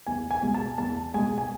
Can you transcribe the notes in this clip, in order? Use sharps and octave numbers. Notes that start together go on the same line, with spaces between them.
E2 G#5
G#5
B2 G#3
A5
E2 A5
B2 G#3 G#5
G#5